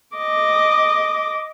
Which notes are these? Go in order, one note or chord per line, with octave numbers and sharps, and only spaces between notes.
D#5 D6